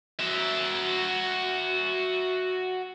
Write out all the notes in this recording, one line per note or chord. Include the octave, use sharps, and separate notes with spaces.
F#4 E5